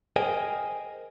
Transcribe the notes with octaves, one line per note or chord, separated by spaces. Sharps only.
G#4 A#4 C5 D#5 G5 G#5